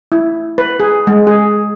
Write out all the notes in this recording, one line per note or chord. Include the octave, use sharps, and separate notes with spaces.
E4
B4
G#4
G#3
G#4